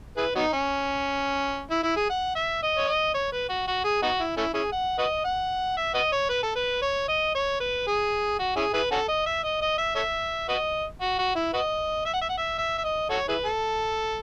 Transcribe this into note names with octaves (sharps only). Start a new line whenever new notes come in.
E4 G#4 B4
F#3 B3 D#4
C#4
E4
E4
G#4
F#5
E5
D#5
C#5
D#5
C#5
B4
F#4
F#4
G#4
B3 D#4 F#4
E4
A3 C#4 E4
C#4 E4 G#4
F#5
F#4 B4 D#5
F#5
E5
F#4 B4 D#5
C#5
B4
A4
B4
C#5
D#5
C#5
B4
G#4
F#4
C#4 E4 G#4
E4 G#4 B4
C#4 F#4 A4
D#5
E5
D#5
D#5
E5
A4 C#5 E5
F#4 B4 D#5
F#4
F#4
E4
F#4 B4 D#5
E5
F#5
E5
F#5
E5
E5
E5
D#5
F#4 A4 C#5
E4 G#4 B4
A4